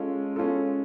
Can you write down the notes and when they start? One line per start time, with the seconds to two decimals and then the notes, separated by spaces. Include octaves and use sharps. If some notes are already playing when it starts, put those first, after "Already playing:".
Already playing: G#3 C#4 F4 A4
0.36 G#3 C#4 F4 A4